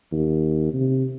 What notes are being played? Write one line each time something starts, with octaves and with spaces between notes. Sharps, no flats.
D#2
C3